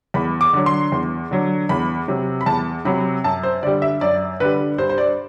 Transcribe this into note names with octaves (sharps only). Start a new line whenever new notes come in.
E2 B5
D6
D3 F#3
C6
E2
D3 F#3
E2 B5
C3 F#3
B5
E2 A5
C3 F#3 B5
F#2 A5
C5
D3 G3 D5
E5
F#2 D5
D3 G3 B4
G2 C5
C5
D5